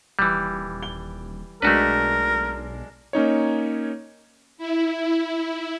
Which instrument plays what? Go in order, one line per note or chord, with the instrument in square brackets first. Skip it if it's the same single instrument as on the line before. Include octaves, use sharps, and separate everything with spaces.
[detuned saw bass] D#1 [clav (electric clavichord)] E3 G3
[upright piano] G7
[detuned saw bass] B1 [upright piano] G#3 D4 [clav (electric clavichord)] A3 F#4 B4 [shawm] A#4
[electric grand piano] A#3 C#4 D#4 C#5
[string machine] E4